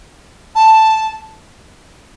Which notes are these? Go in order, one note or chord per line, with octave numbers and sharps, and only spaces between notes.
A5